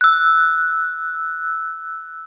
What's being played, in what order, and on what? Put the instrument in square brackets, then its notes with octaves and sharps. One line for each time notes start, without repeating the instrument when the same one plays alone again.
[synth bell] E6 F#6